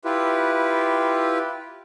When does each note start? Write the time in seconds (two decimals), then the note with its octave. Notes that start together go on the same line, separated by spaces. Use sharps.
0.05 E4 F4 G4 B4